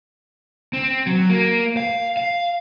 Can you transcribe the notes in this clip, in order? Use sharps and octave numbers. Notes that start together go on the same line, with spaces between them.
C4
F#3
A#3
F5
F5